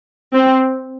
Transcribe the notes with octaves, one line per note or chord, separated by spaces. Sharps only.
C4